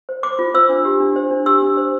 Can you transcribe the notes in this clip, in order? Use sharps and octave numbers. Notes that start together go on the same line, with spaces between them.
C5
C5 D6
F4
C5 E6
D4
G4
D4
C5
D4
G4 E6
D4
C5